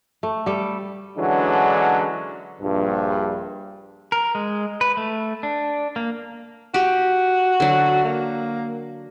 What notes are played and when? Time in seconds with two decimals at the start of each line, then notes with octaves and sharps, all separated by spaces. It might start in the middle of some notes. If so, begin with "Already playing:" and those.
0.23 A3
0.46 G3 A4
1.18 D3 E3 F#3 G#3 C#4 D4
2.61 A#1 G2
4.12 A#4
4.35 G#3
4.81 B4
4.97 A3
5.43 D4
5.96 A#3
6.74 F#4 G4
7.60 D3 F#3
8.04 A#3